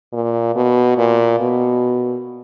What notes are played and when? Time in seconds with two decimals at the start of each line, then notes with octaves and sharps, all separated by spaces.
0.12 A#2
0.55 B2
0.97 A#2
1.40 B2